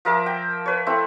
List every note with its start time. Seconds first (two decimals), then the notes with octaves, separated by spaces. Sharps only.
0.05 F3 A#4 E5 D6
0.26 G5
0.66 B4 C#5
0.86 A3 C4 E4